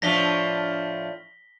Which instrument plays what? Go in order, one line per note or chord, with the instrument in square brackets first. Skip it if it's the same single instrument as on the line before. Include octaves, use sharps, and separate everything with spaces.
[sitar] A2 F3 D4 [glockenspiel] A#6 B6 G7